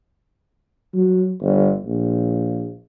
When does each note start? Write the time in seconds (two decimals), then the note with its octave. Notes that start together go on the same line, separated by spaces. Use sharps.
0.94 F#3
1.41 G1
1.85 A#1